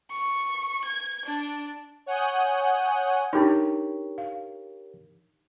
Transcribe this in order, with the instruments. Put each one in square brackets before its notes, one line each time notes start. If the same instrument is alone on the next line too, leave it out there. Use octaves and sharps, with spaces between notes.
[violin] C#6
G#6
D4
[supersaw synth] C#5 F#5 G#5 D#6 F#6 G6
[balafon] D4 D#4 [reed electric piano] G4 A#4 C#5
[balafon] F5